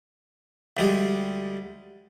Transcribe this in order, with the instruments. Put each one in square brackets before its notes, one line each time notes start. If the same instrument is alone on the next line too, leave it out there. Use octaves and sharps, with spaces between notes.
[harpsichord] D2 G3 G#3